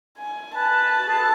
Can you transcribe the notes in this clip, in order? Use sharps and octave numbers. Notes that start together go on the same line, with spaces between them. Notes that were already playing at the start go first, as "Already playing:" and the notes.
G#5
B4 A5
F#4
G#4
A4